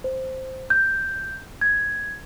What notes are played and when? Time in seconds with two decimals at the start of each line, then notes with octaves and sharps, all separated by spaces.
0.04 C5
0.70 G6
1.61 G#6